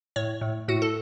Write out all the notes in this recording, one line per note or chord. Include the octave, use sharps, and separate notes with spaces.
A2 C#5
A2
A2 F#4
A4